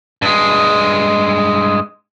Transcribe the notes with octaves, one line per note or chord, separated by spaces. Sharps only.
G2 G#3